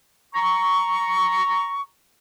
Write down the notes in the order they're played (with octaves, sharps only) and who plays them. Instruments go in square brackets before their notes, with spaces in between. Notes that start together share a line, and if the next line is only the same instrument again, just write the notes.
[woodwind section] A#5 C#6